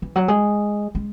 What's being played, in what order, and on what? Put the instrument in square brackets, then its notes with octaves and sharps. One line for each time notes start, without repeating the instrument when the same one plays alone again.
[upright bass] E3
F#3
G#3
G#3